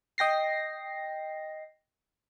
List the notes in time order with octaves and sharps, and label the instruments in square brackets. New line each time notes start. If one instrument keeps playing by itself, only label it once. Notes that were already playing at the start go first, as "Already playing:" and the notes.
[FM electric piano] D#5 G5 A#6 C7